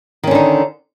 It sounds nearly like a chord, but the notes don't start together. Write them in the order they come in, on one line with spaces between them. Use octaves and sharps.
D#3 C#4 D3 D#4